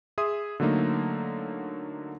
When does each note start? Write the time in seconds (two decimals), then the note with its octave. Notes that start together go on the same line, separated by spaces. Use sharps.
0.18 G#4 E5 C6 D#6
0.60 D3 F#3 A3 A#3 D#4